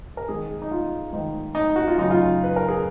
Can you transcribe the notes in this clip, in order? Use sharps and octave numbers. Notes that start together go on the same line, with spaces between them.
A#4
G#2 D#3 G#4
D#4
F4
G#2 D#3 D#4
D#4
F#4
F4
F#2 C#3 D#4
F4
B4
A#4
G#4